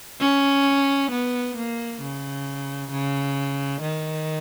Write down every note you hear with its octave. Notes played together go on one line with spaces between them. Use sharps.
C#4
B3
A#3
C#3
C#3
D#3